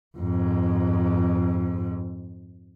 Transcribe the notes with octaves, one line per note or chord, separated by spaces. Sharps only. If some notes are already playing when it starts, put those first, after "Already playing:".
F2 G#2